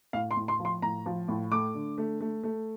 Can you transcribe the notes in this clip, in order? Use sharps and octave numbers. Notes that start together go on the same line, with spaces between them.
A2 F5
C6
A2
C6
F3
C6
A2 A#5
F3
A2
A3 D6
D3
A3
A3
A3